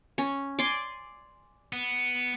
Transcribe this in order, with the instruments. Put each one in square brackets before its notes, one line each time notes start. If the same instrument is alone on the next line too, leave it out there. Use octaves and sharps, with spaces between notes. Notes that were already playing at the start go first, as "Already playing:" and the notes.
[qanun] C#4
D5 G#5 C6
[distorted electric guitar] B3